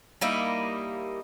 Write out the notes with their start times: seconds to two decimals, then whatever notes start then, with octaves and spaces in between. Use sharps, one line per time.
0.21 G3 A#3 D#4 E4